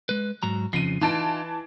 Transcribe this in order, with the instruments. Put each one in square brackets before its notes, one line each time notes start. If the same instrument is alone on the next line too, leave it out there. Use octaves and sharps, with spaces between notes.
[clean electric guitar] G#3 B4
G#2 F#3 A#5
[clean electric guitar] F2 C#3 F3 [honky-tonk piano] C7 D#7
[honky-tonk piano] E3 A5 D7 [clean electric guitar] D#4 F4